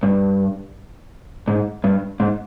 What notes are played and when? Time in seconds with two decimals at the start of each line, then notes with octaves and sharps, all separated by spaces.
0.03 G2
1.48 G#2
1.84 G2
2.20 G#2